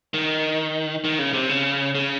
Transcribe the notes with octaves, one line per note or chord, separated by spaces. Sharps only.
D#3
D#3
C#3
C3
C#3
C#3